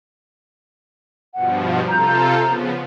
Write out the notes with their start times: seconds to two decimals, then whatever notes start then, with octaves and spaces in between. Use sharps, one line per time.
1.35 G2 B2 F3 F#5
1.89 C3 F4 A4 A#5 G6
2.45 C#3 F3 B3